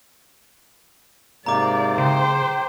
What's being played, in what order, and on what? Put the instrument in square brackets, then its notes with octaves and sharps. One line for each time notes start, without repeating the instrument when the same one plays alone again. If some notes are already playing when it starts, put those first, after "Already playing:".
[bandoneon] G#2 C3 A#3 [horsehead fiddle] D5 [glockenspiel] A#5 D6
[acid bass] C#3 [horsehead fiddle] C5 G5